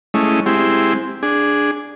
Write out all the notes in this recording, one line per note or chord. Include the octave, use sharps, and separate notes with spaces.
G#3 A3 C#4 E4 D#5
G#3 C4 E4 G4
D4 G#4